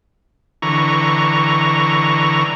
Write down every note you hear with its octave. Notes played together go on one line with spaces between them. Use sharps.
D3 E3 A#5 C#6